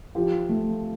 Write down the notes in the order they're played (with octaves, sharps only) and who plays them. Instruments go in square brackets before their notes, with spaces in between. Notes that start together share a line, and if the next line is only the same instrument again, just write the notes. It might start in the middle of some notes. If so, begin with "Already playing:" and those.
[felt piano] F3 [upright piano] G4
[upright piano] A3